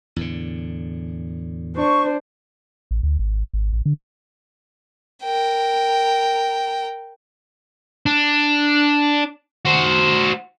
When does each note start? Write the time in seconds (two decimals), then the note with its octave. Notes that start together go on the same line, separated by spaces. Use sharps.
0.16 E2 A2 D3
1.76 D4 C5 C#6
2.91 A1
3.03 D2
3.19 G#1
3.53 G#1
3.73 A1
3.86 D3
5.23 A#4 G5
8.06 D4
9.65 F#4 C5